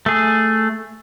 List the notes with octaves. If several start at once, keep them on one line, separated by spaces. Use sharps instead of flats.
A3 G#4